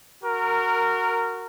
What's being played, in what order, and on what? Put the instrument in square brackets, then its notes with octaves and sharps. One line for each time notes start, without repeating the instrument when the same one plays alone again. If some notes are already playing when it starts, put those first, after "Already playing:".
[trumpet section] F#4 A#4